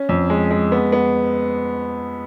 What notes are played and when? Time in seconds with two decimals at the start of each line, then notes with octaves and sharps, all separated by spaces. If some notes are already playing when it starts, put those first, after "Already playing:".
Already playing: C#4
0.09 F2
0.30 G#3
0.51 G#3
0.72 B3
0.92 B3